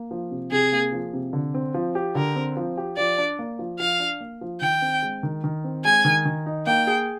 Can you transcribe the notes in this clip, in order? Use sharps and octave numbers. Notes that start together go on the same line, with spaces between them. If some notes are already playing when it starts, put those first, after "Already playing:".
Already playing: A#3
F3
C3
C3 G#4
A#3
F3
C3
D3
C4
F3
G4
D3 A#4
C4
F3
G4
F3 D5
D4
A#3
F3
F3 F5
D4
A#3
F3
D#3 G5
C4
G#3
D#3
D#3
C4
G#3 G#5
D#3
D#3
D#4
A#3 G5
G#4